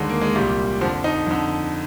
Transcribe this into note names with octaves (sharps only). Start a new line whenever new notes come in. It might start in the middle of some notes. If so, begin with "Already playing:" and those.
Already playing: D#2 D3 G#3
A#3
G#3
C2 A#2 G3
F2 D3 F3
D#4
F2 D3